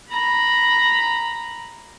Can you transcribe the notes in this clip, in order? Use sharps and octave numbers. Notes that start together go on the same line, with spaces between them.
A#5 B5